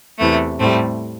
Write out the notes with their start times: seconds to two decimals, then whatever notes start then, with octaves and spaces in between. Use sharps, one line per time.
0.19 E2 C3 E3 A3
0.60 A2 G3 A3 C4